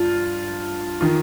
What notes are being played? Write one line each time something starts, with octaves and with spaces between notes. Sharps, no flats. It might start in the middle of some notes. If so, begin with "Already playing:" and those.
Already playing: G2 F4
D#3 F4